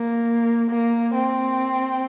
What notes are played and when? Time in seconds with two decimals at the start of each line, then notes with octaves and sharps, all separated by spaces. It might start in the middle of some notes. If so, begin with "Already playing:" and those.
Already playing: A#3
0.70 A#3
1.14 C4